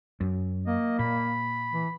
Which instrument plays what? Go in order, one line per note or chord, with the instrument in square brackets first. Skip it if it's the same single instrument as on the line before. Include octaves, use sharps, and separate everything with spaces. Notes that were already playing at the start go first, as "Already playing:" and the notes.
[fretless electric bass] F#2
[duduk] A#3 [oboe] D#5
[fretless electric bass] A#2 [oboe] B5
[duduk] E3